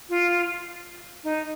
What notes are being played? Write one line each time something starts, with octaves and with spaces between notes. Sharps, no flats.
F4
D#4